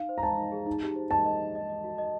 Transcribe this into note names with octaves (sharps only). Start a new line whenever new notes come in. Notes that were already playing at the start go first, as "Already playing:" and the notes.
Already playing: D#4 F5
C5
A#5
C5 A5
D#4
G#4
D#4
G4
C5
D#5 A5
D#5
D#5
D#5
D#5
F#4
D#5